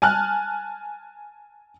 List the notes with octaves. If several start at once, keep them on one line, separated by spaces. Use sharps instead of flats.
G#5 A5 F6 F#6